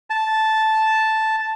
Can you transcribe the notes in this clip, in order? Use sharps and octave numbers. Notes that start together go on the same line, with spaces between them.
A5